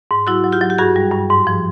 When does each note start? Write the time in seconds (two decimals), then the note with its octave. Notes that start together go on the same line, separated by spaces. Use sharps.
0.11 G#2
0.27 F#3 E4 F#4
0.44 F#3
0.52 F4 G4
0.61 F#3
0.70 G4
0.78 G2 F#4 G#4
0.96 G3
1.12 G2
1.30 G#2
1.47 F3